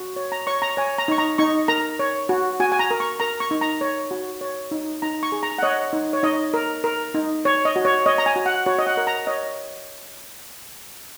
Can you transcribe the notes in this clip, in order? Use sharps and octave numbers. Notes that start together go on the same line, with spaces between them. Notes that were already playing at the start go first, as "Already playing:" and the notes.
Already playing: F#4
C#5
A#5
C#5 C#6
A#5
C#5 G#5
A#5
D#4 C#6
A#5
D#4 C#6
A#4 A#5
C#5
F#4
F#4 G#5
G#5
A#5
A#4
C#6
A#4 A#5
C#6
D#4
A#5
C#5
F#4
C#5
D#4
D#4 A#5
C#6
G#4
A#5
F#5
C#5 D#5
D#4
C#5
D#4 D#5
A#4
A#4
D#4
C#5
D#5
F#4
C#5
C#5 D#5
A#5
G#5
F#4
F#5
F#4 C#5
D#5
F#5
A#4
A#5
C#5 D#5